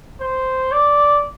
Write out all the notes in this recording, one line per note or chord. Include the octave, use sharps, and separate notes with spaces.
C5
D5